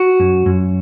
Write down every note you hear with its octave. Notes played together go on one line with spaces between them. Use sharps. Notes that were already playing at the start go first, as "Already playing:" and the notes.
Already playing: F#4
F#2
F#2